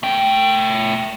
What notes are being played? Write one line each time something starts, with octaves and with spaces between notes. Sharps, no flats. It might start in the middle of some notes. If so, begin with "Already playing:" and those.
A3 G5